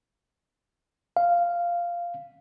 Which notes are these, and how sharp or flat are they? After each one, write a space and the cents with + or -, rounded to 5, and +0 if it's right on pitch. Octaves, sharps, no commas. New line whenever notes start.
F5 -10